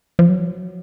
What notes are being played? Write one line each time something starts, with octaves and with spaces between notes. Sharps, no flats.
F3
F#3